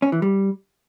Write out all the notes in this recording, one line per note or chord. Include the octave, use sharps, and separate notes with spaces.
C#4
E3
G3